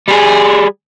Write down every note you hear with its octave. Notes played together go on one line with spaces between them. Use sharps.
G3 G#4